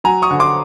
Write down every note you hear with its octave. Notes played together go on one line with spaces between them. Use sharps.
F#3 G#5 A#5
C#6 D#6
D3
C6 D6